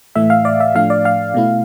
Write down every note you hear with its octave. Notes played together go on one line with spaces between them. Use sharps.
A2 E3 A3 E5
F5
D5
E5
A2 F3 A3 D4 F5
D5
F5
B2 A3 E4